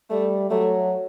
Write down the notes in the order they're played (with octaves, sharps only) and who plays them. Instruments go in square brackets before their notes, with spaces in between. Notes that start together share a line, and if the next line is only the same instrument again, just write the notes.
[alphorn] G3 [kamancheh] A3
[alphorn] F#3 [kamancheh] A3